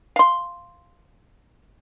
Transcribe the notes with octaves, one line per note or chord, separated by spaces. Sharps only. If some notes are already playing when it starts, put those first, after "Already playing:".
F5 C6